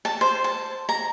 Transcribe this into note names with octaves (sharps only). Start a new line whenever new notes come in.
A5
C5
A5
A#5